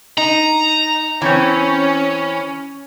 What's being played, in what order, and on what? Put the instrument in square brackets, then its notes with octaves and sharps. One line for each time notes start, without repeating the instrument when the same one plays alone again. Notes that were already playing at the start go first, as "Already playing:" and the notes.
[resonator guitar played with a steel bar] D#4 [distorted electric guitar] A#5
[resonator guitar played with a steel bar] E3 C4 [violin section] C#4